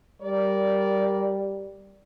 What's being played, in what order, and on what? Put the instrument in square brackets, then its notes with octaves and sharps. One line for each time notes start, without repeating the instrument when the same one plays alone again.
[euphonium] G3 [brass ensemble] A#4 D5